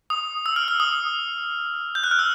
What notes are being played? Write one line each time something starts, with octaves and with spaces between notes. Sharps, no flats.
D#6
E6
F6
E6
D#6
G6
F#6
F6
E6